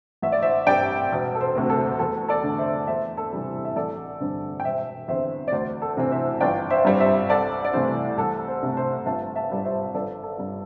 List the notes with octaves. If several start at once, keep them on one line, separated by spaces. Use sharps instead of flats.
A1 E5
D5
C5 E5
G2 G3 C4 D5 G5
E1
A4
C5
D2 C3 A3 C4
A4
E2 A4
A4 D5
D3 A3
C5 E5
E2 C5 E5
A4
C3 E3 G3 C4
E5
A1 A4 D5
G2 D3 C4
G5
E1 C5 E5
E2 D3 C4 C5 E5
D5
D2 C5
A4
C3 E3 C4
C5 E5
G1 D5 G5
C5 E5
G2 G3 C4
C5 E5
C2 A4 D5
D5
C3 E3 A3 C5
C2 A4
C5
C3 A3
C5
G1 E5 A5
E5 A5
G2 G3 C4
C5 E5
G1 A4 D5
A4
G2 G3